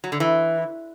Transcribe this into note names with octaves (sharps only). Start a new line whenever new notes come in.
F#3
D3
E3